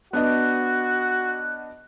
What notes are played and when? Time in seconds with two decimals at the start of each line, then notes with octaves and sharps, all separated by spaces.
0.13 B3 D4 F#4 D#5 F#6